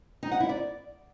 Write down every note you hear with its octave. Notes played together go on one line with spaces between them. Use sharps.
D#4
F#5
E4
D5